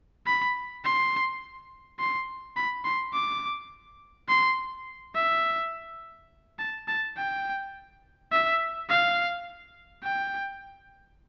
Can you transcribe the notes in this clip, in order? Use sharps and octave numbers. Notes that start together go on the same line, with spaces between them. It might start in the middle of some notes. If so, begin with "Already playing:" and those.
B5
C6
C6
B5
C6
D6
C6
E5
A5
A5
G5
E5
F5
G5